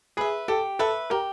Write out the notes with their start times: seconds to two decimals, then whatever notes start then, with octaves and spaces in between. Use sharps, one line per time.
0.17 G#4 B4 E5
0.48 G4 A4
0.79 A4 B4 E5
1.10 G4 A#4